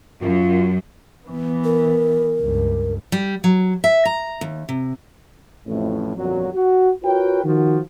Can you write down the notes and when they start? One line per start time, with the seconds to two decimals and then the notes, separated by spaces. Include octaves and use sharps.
0.22 F#2 F4
1.27 E3 B3
1.64 A#4
2.40 C#2 G2
3.12 G3
3.44 F#3
3.84 E5
4.05 A#5
4.41 D#2
4.69 C3
5.67 A1 F2 A2
6.17 G1 F2 A#2 F#3
6.53 F#4
7.03 F4 F#4 A#4 B4 C#5 G5
7.44 D#3 F3 F#4